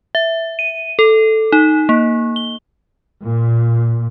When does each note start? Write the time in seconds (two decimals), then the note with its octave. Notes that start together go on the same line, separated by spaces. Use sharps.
0.15 E5
0.59 D#7
0.99 A4
1.52 D#4
1.89 A#3
2.36 G7
3.24 A#2